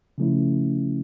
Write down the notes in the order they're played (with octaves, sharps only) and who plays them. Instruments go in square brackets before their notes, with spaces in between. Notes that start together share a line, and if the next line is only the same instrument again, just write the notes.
[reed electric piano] C#3 F3 A3 C#4 E4